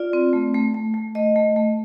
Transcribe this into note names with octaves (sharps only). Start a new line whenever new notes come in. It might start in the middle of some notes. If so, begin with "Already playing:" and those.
Already playing: F4 D5
C4
A3
A3
A3
A3
A3 D#5
A3
A3